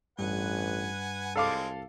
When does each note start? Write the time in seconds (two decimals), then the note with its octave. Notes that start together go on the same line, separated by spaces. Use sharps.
0.19 A1 G2 B4 F#5 G#5
1.36 C2 G3 G#3 C4 A4 F5 D6